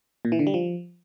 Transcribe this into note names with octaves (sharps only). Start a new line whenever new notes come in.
A#2
E3
D3
G3
F3